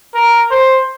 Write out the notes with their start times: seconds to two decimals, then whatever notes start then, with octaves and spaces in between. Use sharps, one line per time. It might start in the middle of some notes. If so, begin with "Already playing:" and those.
0.15 A#4
0.51 C5